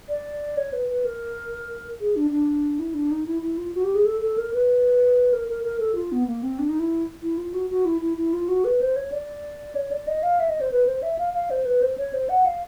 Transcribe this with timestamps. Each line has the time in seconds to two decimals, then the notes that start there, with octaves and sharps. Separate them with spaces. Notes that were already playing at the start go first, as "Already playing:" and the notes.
0.09 D5
0.57 C#5
0.73 B4
0.89 B4
1.05 A#4
2.00 G#4
2.16 D4
2.31 D4
2.79 E4
2.94 D4
3.11 D#4
3.26 E4
3.42 E4
3.58 F4
3.75 F#4
3.84 G4
3.95 G#4
4.06 A4
4.21 A4
4.38 A#4
4.54 B4
5.33 A#4
5.49 A#4
5.64 A#4
5.80 A4
5.95 F4
6.12 B3
6.27 A#3
6.43 C4
6.59 D4
6.69 D#4
6.80 E4
7.23 E4
7.38 F4
7.54 F#4
7.70 F#4
7.85 E4
8.01 E4
8.17 E4
8.33 F4
8.48 F#4
8.64 B4
8.81 C5
8.96 C#5
9.12 D5
9.75 C#5
9.91 D5
10.07 D#5
10.23 F5
10.40 E5
10.49 D#5
10.61 C5
10.71 B4
10.87 C5
11.03 E5
11.19 F5
11.34 F5
11.51 C5
11.65 B4
11.82 C5
11.98 C#5
12.13 C5
12.29 F#5
12.46 F5